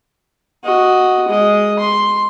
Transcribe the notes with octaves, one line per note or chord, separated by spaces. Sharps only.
F#4 D#5
G#3 D#5
C6